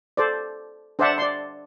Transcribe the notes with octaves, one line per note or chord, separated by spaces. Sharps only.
A4 C5 D5
D4 C5 D5 E5 F#5 A5
D5 C6